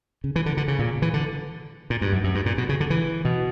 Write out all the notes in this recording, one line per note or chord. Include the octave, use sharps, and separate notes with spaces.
C#3
E3
D3
D3
C#3
A#2
E3
D3
A#2
G2
F#2
F#2
G2
A#2
B2
C#3
D3
E3
B2